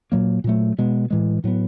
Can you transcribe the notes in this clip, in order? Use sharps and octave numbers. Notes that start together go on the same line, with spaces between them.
A#2 F#3 A#3
A#2 F#3 A3
B2 G#3 B3
A2 E3 G#3
A2 F#3 B3